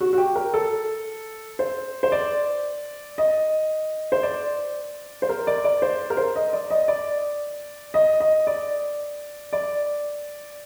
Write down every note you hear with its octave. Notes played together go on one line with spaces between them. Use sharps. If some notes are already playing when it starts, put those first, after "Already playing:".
F#4
F#4
G4
A#4
A4
C5
C5
D5
D#5
C5
D5
C5
A#4
D5
D5
C5
A#4
C5
D#5
D5
D#5
D5
D#5
D#5
D5
D5